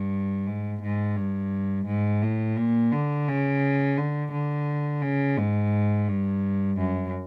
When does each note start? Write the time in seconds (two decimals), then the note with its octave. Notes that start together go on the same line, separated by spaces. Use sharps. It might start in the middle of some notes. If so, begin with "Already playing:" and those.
Already playing: G2
0.47 G#2
0.82 G#2
1.16 G2
1.86 G#2
2.22 A2
2.57 A#2
2.92 D3
3.27 C#3
3.97 D3
4.32 D3
5.02 C#3
5.37 G#2
6.08 G2
6.78 F#2